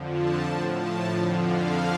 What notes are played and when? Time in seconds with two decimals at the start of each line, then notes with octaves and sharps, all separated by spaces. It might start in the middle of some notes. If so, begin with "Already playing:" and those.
Already playing: F2 D3 F3
0.11 A5
0.45 A2 F3 A5
0.77 A5
1.10 F2 D3 F3 F5
1.43 F5